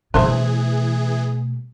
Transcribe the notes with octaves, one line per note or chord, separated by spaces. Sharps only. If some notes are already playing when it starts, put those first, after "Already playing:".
B2 E3 A3 D4 G#4 C5 E5